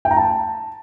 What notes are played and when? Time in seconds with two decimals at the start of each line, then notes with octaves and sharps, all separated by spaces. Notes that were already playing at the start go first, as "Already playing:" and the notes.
0.05 G5
0.11 A#5
0.17 A5